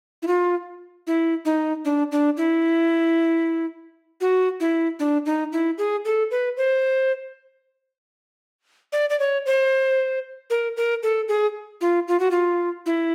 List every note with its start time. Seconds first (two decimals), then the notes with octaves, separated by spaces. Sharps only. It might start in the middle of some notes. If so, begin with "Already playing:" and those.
0.22 E4
0.27 F4
1.07 E4
1.45 D#4
1.85 D4
2.12 D4
2.37 E4
4.21 F#4
4.60 E4
5.00 D4
5.26 D#4
5.52 E4
5.78 G#4
6.05 A4
6.31 B4
6.57 C5
8.93 D5
9.10 D5
9.20 C#5
9.46 C5
10.50 A#4
10.77 A#4
11.03 A4
11.28 G#4
11.81 F4
12.08 F4
12.20 F#4
12.31 F4
12.86 E4